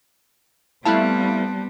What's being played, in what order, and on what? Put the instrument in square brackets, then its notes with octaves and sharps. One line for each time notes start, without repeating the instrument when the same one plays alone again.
[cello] G3 C4 [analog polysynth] A3 E4 F5 [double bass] B3 [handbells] A5 F#6